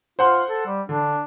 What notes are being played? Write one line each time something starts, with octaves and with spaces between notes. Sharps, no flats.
F4 C5 F#5 C6
A4
G3
D3 D4